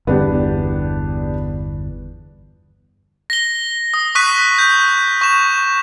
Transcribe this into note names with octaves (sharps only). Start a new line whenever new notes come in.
G1 E2 B3 D4 G4
A#6 G7
D#6
C#6 D#6 F#6 B6 D#7
G6
C#6 E7